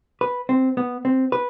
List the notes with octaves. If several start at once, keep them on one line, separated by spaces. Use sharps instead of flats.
B4
C4
B3
C4
B4